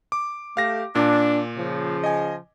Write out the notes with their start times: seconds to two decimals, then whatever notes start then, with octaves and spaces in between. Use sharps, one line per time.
0.12 D6
0.57 A3 G4 F5 A#6
0.95 A#2 D4
1.57 C#3 F3
2.04 D#5 G#5